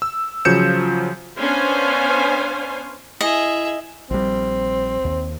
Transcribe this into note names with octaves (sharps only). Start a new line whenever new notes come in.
E6
C#3 F3 F#3 G6 C#7 E7
B3 C#4 D4 C5 F5 G#5
E4 G#4 D#5 E5
A#1 G3 C4
D#2